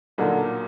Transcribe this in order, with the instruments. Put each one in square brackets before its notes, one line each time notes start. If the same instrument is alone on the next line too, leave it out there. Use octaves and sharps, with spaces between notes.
[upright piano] B1 A#2 F#3 A#3 [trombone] D3